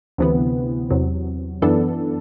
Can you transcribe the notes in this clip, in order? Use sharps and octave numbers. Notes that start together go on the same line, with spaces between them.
D2 C3 E3 B3
E2 C3 F#3
F#2 E3 B3 D4 A4